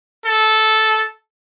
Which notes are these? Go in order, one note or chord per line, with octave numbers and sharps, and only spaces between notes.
A4